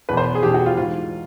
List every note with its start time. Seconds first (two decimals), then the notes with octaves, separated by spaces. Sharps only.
0.09 E2 B2 B4
0.17 C5
0.35 G#4
0.43 E2 B2 G4
0.54 F#4
0.66 F4
0.77 G#2 E3 F4